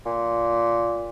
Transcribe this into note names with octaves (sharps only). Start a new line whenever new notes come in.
A#2